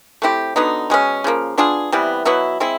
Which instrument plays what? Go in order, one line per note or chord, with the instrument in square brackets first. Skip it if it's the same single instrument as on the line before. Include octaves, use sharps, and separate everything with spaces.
[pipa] A3 C4 E4 G4
D3 F#3 B3 D#4
B2 G#3 C#4
C#3 F3 A#3
B3 D4 F4 G#4
C3 E3 G3 B3
B2 F#3 B3 E4
G#3 C4 E4